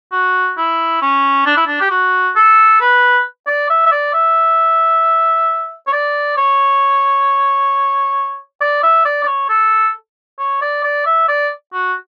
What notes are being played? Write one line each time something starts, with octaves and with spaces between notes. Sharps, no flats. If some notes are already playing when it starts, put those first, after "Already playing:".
F#4
E4
C#4
D4
E4
D4
G4
F#4
A4
B4
D5
E5
E5
D5
E5
C#5
D5
C#5
D5
E5
D5
D5
C#5
A4
C#5
D5
D5
E5
D5
F#4